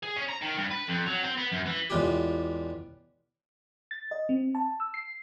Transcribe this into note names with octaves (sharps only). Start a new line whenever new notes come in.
G#4
C#4
A#5
D#3
G2
B4
F2
F#3
C4
B3
F#2
E3
A1 E2 G#3 B3 F4 G4
A6
D#5
C4
A5
E6
C7